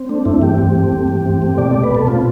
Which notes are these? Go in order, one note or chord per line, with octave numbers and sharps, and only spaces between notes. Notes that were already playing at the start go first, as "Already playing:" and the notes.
Already playing: C4
A3 D4
G2 E4
E3 G4
C4
A3
G2
E3
C4
A3
B2 D5
A3 D5
B4
B2 A4
C4 F4